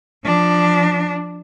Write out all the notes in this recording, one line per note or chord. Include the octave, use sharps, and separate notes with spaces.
F3 D4